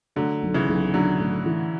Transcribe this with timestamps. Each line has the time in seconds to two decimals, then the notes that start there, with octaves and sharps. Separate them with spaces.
0.16 D3 F#3 A3
0.42 B1
0.54 C#3 E3
0.68 B1
0.94 B1 D3 F#3
1.19 A2
1.46 E3